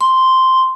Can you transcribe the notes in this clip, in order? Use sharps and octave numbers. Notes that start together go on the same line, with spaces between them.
C6